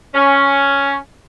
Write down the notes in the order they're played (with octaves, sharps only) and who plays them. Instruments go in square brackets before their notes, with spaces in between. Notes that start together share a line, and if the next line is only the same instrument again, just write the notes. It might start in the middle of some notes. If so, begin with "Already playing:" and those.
[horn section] C#4